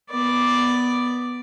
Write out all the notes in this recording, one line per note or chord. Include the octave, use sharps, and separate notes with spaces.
B3 D5